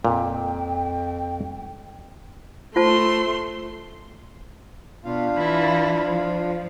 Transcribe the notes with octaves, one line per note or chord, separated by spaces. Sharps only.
F2 A#2 G5
A3 F4 C5 A5 C6
B2 D4 F4 F5
E3 E4
F3